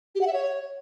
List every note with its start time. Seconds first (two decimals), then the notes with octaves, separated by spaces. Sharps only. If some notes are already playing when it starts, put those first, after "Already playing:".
0.15 G4
0.21 F#5
0.27 E5
0.33 C#5